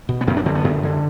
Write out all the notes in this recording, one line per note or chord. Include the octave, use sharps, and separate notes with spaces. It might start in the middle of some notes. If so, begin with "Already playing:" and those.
B2
B3
F#2 C4
D4
D3 C4
B3
F#2
D3